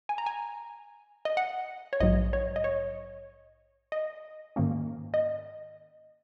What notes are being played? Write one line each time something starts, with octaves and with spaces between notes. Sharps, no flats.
G#5
A#5
G#5
D#5
F#5
C#5
A#1 G#2 F#3 D#5
C#5
D#5
C#5
D#5
G#2 D#3 A#3 C#4
D#5